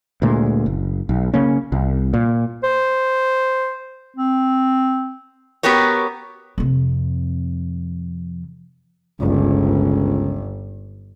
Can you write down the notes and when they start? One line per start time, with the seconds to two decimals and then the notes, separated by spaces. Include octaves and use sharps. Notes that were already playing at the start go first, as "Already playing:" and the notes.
0.22 D2 A#2 G#3
0.66 F#1
1.09 B1
1.34 C#3 A#3 C#4
1.72 C2
2.14 A#2
2.64 C5
4.17 C4
5.63 B3 F#4 G4 A#4 C#5
6.58 F2 C3
9.20 G1 C#2